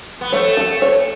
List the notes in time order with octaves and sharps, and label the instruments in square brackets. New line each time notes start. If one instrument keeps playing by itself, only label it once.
[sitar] B3
[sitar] A3 [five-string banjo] C#5
[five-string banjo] A4
C#5